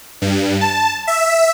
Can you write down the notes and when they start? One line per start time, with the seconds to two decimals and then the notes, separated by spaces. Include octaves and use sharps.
0.22 G2
0.61 A5
1.07 E5